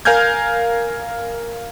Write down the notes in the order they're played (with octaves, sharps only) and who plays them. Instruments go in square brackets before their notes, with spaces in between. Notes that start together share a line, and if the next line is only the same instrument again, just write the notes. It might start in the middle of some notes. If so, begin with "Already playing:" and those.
[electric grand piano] A#4 F5 G#5 F6 G6 G#6